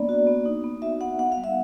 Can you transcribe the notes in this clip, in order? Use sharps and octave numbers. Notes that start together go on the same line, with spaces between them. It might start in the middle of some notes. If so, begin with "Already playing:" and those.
Already playing: A#3 B3 D4 D5
F#4
B3
D#4
B3
F#4 E5
B3 F#5
B3 F#5
F5
G3
E5